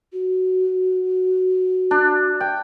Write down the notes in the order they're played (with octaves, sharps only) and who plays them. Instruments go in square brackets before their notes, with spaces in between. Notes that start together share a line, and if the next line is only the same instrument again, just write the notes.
[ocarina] F#4
[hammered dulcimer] D4
G5